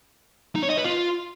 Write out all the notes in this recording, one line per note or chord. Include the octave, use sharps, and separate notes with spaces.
D#4
C#5
D#5
B4
F4